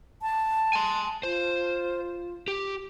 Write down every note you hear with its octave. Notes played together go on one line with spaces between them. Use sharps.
A5
G#5 C6
F4 C5
G4